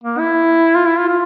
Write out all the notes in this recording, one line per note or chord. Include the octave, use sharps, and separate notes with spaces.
A#3
E4
F4
E4
F4
F4